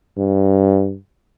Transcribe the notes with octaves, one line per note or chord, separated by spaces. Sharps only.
G2